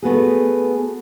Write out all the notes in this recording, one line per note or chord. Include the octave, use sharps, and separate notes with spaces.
A3 B3 F#4 G#4